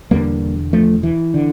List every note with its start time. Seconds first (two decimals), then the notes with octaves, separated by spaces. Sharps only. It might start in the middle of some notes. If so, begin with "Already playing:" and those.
0.11 E1 E2 D3 G3 A#3
0.73 F3 A3
1.03 E3
1.34 D3